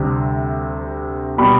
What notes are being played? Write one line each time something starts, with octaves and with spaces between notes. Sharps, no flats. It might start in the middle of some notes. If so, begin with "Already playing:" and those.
Already playing: D2 C3 G3
B2 G3 B5